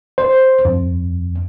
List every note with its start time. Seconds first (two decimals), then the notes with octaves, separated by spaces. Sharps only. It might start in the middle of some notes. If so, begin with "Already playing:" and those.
0.18 C5
0.65 F2